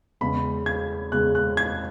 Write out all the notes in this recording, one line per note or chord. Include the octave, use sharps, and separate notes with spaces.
E2 C#3 G#3 B5
G#6
E2 C#3 G#3 F#6
F#6
G#6